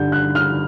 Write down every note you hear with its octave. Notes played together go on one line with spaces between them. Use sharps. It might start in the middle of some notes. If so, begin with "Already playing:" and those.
Already playing: G2 D3 G3 G6
F#6
F6